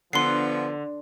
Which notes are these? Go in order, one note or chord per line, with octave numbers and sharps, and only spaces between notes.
D3 F3 B3 C6 C7